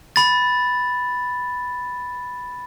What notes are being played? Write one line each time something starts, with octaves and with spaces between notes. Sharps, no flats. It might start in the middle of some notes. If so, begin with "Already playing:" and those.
B5 A6